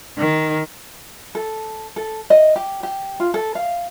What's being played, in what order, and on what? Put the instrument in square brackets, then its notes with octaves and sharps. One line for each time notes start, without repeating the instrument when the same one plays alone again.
[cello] D#3
[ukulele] A4
A4
D#5
G4
G4
F4
A4
F5